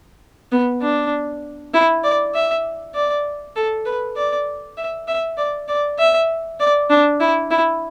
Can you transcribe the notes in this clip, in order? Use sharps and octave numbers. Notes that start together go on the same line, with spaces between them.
B3
D4
E4
D5
E5
D5
A4
B4
D5
E5
E5
D5
D5
E5
D5
D4
E4
E4